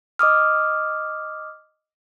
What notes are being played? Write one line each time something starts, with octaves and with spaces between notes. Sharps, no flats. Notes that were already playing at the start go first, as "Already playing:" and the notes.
D#5 D6 D#6 F6